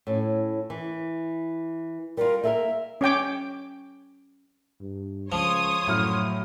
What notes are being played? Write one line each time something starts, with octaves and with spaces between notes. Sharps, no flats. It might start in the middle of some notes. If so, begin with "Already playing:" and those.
A2 C#4
E3
G3 F4 A#4
A#3 A4 A#4 E5
C#4 C#5 G5 D6
G2
C#2 F3 C#5 C6 D#6
F#2 A2 F#3 F6